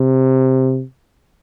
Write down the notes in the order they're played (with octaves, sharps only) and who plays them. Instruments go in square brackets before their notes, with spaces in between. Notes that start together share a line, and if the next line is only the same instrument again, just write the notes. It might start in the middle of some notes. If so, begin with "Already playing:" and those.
Already playing: [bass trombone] C3